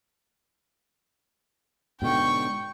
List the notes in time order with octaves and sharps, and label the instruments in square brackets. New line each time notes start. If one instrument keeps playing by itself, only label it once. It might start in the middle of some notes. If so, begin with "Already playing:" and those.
[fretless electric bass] G#2 B2 D3 [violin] G5 C#6